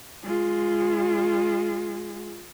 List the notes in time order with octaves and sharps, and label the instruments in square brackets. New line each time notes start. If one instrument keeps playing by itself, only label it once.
[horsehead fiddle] G#3 F4